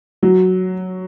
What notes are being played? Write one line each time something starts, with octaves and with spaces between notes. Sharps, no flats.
F#3 F#4